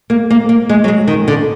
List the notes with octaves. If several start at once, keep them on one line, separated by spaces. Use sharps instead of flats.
A#3
A#3
A#3
G#3
F#3
G#3
D#3
D3